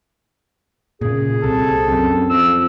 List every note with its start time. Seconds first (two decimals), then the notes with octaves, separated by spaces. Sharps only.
1.01 A#2 C#3 G#4
1.44 C2 C3 A4
1.88 F#2 C4
2.30 F2 E6